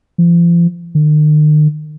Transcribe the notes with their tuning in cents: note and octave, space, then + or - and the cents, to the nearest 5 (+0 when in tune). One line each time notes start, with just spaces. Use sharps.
F3 -40
D#3 -45